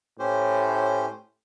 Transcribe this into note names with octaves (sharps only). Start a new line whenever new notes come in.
A2 C#4 G4 C5